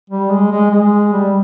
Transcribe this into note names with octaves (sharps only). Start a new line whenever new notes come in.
G3
G#3
G#3
G#3
G3